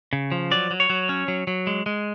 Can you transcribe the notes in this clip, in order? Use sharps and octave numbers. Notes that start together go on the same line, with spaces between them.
C#3
F3
F#3 D5
F#3
C#5
F#3
C#4
F#3
F#3
G#3
G#3